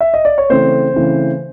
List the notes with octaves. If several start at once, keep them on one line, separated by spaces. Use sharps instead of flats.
E5
D#5
D5
C#5
C#3 E3 A3 C4 C5
C#3 E3 A3 C4